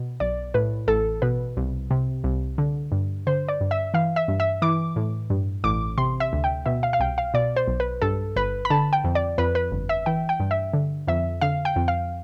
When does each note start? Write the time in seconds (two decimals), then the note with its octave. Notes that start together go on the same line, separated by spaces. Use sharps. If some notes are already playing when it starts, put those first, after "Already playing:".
Already playing: B2
0.20 B1 D5
0.54 A2 B4
0.88 A1 A4
1.22 B2 B4
1.57 C2
1.91 C3
2.24 C2
2.58 D3
2.92 G2
3.27 D3 C5
3.48 D5
3.61 G2
3.71 E5
3.94 E3 F5
4.16 E5
4.28 G2
4.40 E5
4.62 E3 D6
4.96 A2
5.30 G2
5.64 A1 D6
5.98 C3 C6
6.20 E5
6.33 D2
6.44 G5
6.66 B2 E5
6.83 F5
6.93 F5
7.00 C2 G5
7.18 F5
7.34 B2 D5
7.56 C5
7.68 B1
7.80 B4
8.02 G2 A4
8.36 G1 B4
8.65 B5
8.70 D3 A5
8.93 G5
9.04 F2
9.15 D5
9.38 F2 B4
9.55 B4
9.72 G1
9.89 E5
10.06 E3 G5
10.29 G5
10.40 G2
10.51 E5
10.73 D3
11.07 F2 E5
11.41 D3 F5
11.65 G5
11.76 F2
11.88 F5